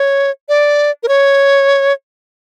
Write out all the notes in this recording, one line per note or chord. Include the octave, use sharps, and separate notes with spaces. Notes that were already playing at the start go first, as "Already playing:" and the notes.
Already playing: C#5
D5
A#4
C#5